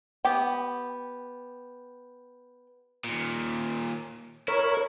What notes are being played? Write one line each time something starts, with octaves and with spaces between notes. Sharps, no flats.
B3 G4 G5
D#2 A#2
E4 A#4 C#5